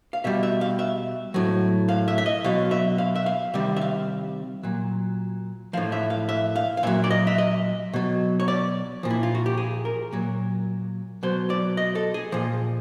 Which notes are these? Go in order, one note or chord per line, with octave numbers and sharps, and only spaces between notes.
F5
B2 G3 E5
E5
F5
E5
A2 F#3
F5
E5
E5
D#5
B2 F#3 F5
E5
F5
E5
F5
C3 D#3 G3 E5
E5
F5
A#2 F#3
A2 F3 F5
E5
F5
E5
F5
F5
A#2 F#3 E5
D5
D#5
E5
D#5
B2 F#3
C#5
D5
A#2 F3
E4
F4
F#4
G4
G#4
A#4
A#2 F#3
B2 F#3 C5
D5
D#5
A4
G#4
A#2 F3